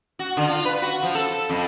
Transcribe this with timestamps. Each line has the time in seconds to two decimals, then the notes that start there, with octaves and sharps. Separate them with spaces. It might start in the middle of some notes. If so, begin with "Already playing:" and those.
0.19 F#4
0.37 D3
0.48 F4
0.65 B4
0.82 F#4
1.03 F3
1.15 A4
1.50 F2